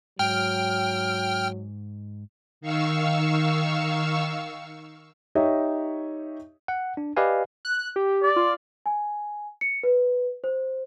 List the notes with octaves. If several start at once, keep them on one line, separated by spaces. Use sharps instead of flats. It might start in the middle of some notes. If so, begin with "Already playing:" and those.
G#2 F#3 G5 F6
D#3 F5 C#6 E6
D#4 G4 C#5 D#5 E5
F#5
D4
G4 B4 D5 D#5 F5 G#5
F#6
G4
D5
F4
G#5
C#7
B4
C5